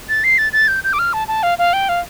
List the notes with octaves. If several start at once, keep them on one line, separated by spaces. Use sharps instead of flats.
A6
C7
A6
A6
G6
G6
D6
F6
A5
A5
F5
F5
G5
F5